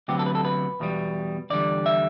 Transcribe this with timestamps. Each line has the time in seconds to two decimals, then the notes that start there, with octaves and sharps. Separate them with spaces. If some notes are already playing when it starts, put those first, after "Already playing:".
0.08 D2 C3 F#3 B3 G4
0.19 A4
0.26 B4
0.35 A4
0.45 B4
0.80 E2 B2 G3
1.50 E2 D3 G3 D5
1.86 E5